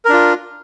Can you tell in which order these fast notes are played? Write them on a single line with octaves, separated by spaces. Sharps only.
A#4 D4 F4